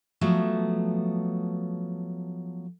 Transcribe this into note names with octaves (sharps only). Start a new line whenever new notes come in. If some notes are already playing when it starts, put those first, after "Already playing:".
F3 F#3 A3 B3